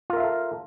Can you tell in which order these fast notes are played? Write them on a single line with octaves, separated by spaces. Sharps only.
F4 A#4 E5 F5 A4